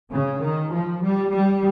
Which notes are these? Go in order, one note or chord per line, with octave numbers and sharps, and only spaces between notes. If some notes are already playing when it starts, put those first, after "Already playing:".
C#3
D#3
F3
G3
G3